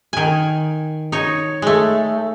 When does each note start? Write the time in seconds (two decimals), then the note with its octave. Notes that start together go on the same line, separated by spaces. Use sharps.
0.13 D#3 G#5
1.12 D#4 C#5
1.62 G#3 A3